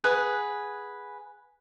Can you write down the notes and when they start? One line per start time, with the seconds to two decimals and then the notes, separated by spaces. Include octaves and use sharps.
0.04 G#4 B4 F#5